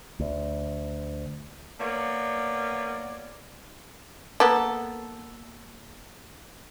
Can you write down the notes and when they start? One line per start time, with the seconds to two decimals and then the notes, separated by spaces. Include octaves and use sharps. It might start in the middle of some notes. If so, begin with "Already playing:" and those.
0.20 D2
1.80 A#3 B3 C#5 D5
4.40 A#3 B3 A4